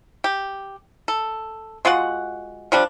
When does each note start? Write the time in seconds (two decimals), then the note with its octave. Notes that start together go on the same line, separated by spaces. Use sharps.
0.24 G4
1.08 A4
1.85 G#3 F4 F#4 F#5
2.72 F3 G3 D4